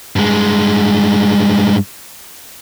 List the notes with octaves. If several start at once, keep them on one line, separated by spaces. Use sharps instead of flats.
G2 G#3